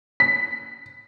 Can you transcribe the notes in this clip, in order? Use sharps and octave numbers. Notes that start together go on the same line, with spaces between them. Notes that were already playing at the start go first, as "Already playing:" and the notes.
B6